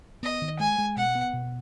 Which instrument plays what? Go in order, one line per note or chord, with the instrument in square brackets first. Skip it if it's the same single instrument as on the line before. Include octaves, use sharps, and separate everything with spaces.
[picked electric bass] B3 [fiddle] D#5
[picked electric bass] D#3
[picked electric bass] G#3 [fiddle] G#5
[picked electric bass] G#3
[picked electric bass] B2 [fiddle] F#5
[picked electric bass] B3
B2